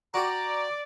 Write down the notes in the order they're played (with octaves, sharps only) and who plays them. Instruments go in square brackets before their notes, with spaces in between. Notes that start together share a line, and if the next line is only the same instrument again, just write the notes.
[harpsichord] F#4 G4 [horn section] D5 [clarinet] A#5